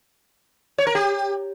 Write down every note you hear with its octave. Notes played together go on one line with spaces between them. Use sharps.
C#5
A#4
G4